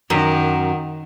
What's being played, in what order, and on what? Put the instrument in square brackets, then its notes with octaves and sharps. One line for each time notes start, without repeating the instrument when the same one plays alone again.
[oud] F#2 [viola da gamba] D#3